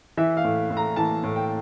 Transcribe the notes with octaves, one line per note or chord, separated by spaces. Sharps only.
E3 E5
F5
A2
A2
A#5
E3 A5
A2
G5